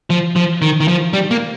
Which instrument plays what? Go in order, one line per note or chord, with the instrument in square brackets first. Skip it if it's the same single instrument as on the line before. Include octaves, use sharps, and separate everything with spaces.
[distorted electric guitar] F3
F3
D#3
D#3
F3
G3
A#3